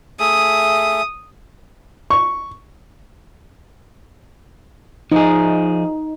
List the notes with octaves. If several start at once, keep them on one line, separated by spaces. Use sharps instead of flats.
A3 G#4 E5 D#6
C#6
F3 D#4 G#4